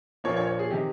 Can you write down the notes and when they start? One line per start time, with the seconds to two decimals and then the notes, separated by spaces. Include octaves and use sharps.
0.24 A#1 A#2 F3 A#3 C#5
0.37 C#5
0.47 C#5
0.59 G#4
0.70 C3 D#3 G4